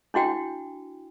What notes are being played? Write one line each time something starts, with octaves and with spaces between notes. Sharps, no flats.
D4 E4 F#4 G5